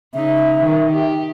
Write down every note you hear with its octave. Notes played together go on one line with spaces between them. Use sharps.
C#3 D#4 E5
D#3
G4